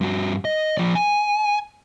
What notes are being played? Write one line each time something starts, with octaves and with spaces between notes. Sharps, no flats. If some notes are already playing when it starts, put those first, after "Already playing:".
G2 F#4
D#5
F3 D5
G#5